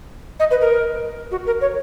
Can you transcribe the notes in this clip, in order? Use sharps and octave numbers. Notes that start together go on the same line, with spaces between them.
D#5
B4
A#4
F#4
A#4
C#5